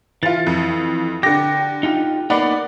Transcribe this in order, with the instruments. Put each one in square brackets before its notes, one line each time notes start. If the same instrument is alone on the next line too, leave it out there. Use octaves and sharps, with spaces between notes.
[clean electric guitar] E3 [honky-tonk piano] F4 A6
[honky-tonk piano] F2
[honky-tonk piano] D3 A#6 [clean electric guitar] G4
[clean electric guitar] D#4 F4 G4
[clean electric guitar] A#3 B3 D#4 [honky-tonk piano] D5 F#5 B5